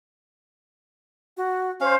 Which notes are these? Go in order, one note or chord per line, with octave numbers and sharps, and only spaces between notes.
F#4
C#4 C5 C#5 F5